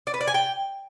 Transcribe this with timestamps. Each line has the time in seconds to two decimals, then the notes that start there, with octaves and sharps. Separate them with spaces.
0.07 D5
0.14 B4
0.21 D5
0.27 G#5
0.34 G5